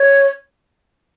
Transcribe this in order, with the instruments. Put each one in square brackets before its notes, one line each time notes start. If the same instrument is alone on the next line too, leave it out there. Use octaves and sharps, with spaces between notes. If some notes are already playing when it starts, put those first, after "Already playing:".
Already playing: [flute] C#5